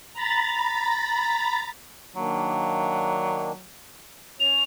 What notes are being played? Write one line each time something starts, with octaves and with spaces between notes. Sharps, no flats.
A#5 B5 A6
D#3 F#3 A#3 D4
C#4 C#5 F7